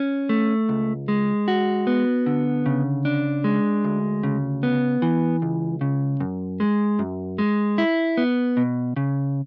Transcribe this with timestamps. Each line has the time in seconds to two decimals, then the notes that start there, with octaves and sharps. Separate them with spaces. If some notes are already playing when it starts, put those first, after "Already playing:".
Already playing: C#4
0.29 A3
0.69 C#2
1.08 G#3
1.48 F#4
1.87 B3
2.26 D3
2.66 C#3
3.05 D4
3.44 G#3
3.84 D2
4.23 C#3
4.63 B3
5.02 E3
5.42 C#2
5.81 C#3
6.20 F#2
6.60 G#3
6.99 F#2
7.38 G#3
7.78 E4
8.17 B3
8.57 B2
8.96 C#3